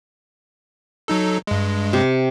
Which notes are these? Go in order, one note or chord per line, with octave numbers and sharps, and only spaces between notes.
F#3 D#4 A4
G2 G#3
C3